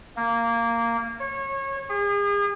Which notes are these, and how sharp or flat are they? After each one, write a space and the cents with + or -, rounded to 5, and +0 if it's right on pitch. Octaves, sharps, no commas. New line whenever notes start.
A#3 -10
C#5 -25
G#4 -40